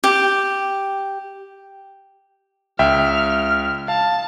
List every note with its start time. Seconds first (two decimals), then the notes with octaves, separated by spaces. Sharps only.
0.04 G4
2.79 C#2 E5 G5 F6
3.88 F5 A5